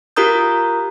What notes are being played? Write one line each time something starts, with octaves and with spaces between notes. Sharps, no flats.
F4 G4 A#4 A#5 D#6 G6